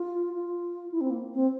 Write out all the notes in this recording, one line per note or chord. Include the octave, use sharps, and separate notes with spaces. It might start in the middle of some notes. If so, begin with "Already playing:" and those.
Already playing: F4
F4
E4
C4
A#3
C4